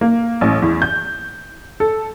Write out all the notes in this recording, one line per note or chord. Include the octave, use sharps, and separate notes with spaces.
A#3
A1
E2
G6
A4